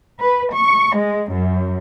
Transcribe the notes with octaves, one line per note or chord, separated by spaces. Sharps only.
B4
C#6
G#3
F#2